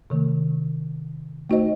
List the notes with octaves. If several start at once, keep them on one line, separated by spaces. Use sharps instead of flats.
C3 D#3 A3
A3 D#4 F#4 C5 D#5